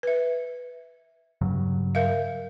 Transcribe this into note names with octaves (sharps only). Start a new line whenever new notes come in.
B4 E5
G2 C#3 F#3
A#4 E5 F5